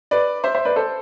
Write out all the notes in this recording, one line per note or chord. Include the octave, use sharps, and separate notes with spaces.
B4 D5
C5 E5
C5 E5
B4 D5
A4 C5